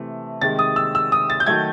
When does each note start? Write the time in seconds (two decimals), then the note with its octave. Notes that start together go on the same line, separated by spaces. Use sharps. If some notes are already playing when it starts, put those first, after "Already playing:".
Already playing: C3 E3 A3
0.42 C3 D#3 G#3 A6
0.59 D#6
0.76 E6
0.95 E6
1.12 D#6
1.30 A6
1.40 G6
1.47 D#3 F#3 A3 G#6